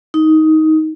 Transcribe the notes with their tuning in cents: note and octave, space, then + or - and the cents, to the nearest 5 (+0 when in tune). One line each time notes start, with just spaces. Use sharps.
D#4 +15